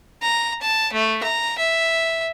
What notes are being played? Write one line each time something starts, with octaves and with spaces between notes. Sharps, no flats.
A#5
A5
A3
A#5
E5